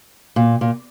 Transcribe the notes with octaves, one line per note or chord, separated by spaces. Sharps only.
A#2
A#2